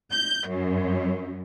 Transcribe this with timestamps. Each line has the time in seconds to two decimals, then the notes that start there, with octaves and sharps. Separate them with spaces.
0.12 G6
0.48 F#2